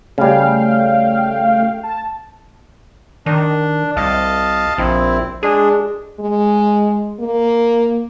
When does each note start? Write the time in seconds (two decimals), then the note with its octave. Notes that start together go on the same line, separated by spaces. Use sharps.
0.18 C#3 G3 A3 F5 G5
1.83 A5
3.26 D#3 D4
3.96 C2 D#5 F5 A5
4.78 A#1 C4 E4
5.43 G#3 D4 G#4
6.20 G#3
7.20 A#3